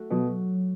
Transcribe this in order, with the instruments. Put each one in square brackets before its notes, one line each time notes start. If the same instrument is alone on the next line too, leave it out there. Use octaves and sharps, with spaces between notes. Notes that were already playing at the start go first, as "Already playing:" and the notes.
Already playing: [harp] A3 F#4
[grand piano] B2 [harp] F#3